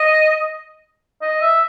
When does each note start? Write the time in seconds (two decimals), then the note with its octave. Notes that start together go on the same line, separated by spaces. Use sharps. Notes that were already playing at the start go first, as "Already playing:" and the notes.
Already playing: D#5
1.22 D#5
1.41 E5